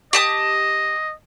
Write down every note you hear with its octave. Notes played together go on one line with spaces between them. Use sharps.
G4 D#5 A5 D#6